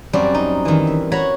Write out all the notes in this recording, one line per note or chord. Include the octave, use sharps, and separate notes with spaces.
F#2 G3 C4 F#4 D5
D#4
D#3 E3
E5
F#4 C#5 A#5 B5